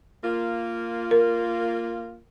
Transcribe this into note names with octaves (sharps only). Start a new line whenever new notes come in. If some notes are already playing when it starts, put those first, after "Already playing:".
A#3 F4
A#4